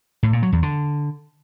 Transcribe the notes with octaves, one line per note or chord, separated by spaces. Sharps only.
A2
A#2
F#3
E2
D3